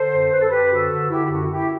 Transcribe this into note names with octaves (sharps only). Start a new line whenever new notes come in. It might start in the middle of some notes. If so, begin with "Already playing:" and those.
Already playing: D3 A4 C5
F#2
F#2 B4
A4
F#2 G4 B4
D3 F#4 A4
D3
D3 E4 G4
E4
F#2 F#4
F#2 E4 G4